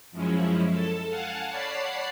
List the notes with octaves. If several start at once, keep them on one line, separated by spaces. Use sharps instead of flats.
F#2 F3 G#3 C#4 E4
A4 A5
F5 F#5 G#5 A5
C#5 D5 F#5 A5 B5 C7